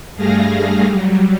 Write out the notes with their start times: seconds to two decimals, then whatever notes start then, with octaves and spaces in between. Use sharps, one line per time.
0.16 G2 G3 A3 G#4 F5 A#6
0.85 F#3 G3